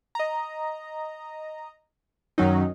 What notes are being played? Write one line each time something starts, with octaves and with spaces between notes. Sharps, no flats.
D#5 A#5
F#2 D#3 F#3 C#4 D#4